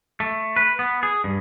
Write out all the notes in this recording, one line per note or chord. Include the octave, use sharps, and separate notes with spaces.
A3
B4
B3
G#4
G2